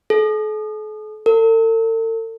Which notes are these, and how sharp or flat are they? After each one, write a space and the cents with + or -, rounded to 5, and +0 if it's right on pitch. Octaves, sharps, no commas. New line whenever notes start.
A4 -45
A4 +45